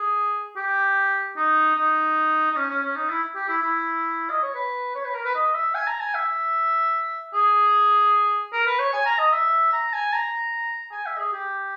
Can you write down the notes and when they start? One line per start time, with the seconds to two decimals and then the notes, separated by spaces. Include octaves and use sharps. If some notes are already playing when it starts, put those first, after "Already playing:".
Already playing: G#4
0.56 G4
1.36 D#4
1.75 D#4
2.51 D#4
2.56 C#4
2.69 C#4
2.82 C#4
2.95 D#4
3.09 E4
3.35 G4
3.48 E4
3.62 E4
4.30 D#5
4.42 C#5
4.55 B4
4.95 C#5
5.05 B4
5.14 A#4
5.25 B4
5.35 D#5
5.54 E5
5.75 G#5
5.87 A#5
6.00 G#5
6.14 E5
7.33 G#4
8.52 A#4
8.66 B4
8.79 C#5
8.93 G#5
9.05 A#5
9.19 D#5
9.33 E5
9.72 A#5
9.93 G#5
10.13 A#5
10.92 G#5
11.06 E5
11.18 G#4
11.32 G4